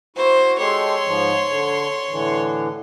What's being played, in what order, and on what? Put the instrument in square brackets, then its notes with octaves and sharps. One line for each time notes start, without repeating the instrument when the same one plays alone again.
[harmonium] E4 F#4 [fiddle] C5
[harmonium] G#3 G4 A4 [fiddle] C#5 C6
[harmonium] G#2 F3
D3
A2 D3 E3